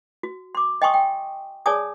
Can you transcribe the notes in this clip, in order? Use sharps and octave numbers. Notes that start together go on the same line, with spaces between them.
F#4
C6 D6
D#5 G5 G#5 C6 C#6 D#6
G5
G#4 C#5 D5 G#5 A5 D#6